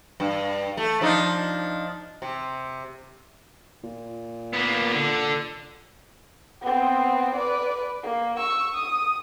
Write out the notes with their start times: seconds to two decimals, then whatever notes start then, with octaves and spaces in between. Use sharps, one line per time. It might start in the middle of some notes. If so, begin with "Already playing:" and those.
0.20 G2
0.77 A3
1.01 F3 D4 D#4
2.22 C3
3.84 A#2
4.53 A#3 B3
4.94 D3
6.62 B3 C4
7.36 B4 D5
8.03 A#3
8.37 C#6 E6
8.75 D#6